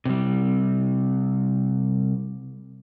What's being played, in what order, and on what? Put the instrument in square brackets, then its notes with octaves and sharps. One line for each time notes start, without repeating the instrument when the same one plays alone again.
[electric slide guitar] C3 G3